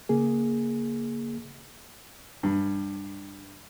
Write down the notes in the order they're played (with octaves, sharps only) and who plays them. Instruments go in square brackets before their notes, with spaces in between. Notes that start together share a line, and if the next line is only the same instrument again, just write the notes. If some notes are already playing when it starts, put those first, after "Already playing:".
[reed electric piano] C#3 A#3 G#4
[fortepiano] G2